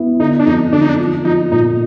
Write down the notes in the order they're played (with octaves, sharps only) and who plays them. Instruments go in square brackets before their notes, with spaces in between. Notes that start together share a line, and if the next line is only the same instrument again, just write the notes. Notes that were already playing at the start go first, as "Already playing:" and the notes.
Already playing: [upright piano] B3 E4
[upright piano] D3 [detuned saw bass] D#4
[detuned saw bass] D4
[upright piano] F2 [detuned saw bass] D#4
[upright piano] D3 [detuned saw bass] D4
[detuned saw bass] D#4
D4
[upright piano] F3
[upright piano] F3 [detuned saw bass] D#4
[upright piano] A#2 [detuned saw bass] D#4